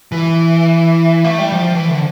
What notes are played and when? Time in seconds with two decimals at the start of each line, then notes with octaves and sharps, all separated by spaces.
0.12 E3
1.24 A3
1.38 G3
1.52 F3
1.75 E3
1.89 D3